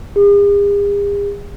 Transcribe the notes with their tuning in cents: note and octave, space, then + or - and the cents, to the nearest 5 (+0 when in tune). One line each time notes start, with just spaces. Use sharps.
G#4 -45